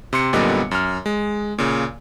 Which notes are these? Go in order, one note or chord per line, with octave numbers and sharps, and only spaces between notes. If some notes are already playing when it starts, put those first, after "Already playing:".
C3 C6 C#7
F#2 A#2 D3 G3 B3 D#5
F#2 F6
G#3
A#2 C#3